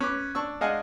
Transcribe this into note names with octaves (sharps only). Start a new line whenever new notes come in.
C#4 B4 D6
D4 C#6 E6
G#3 D4 D#5 F5 F#5 G#5